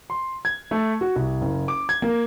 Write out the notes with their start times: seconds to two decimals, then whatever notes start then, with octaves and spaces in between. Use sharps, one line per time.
0.10 C6
0.45 G#6
0.71 A3
1.01 F#4
1.16 C2
1.41 F#1
1.68 D6
1.89 G#6
2.02 A#3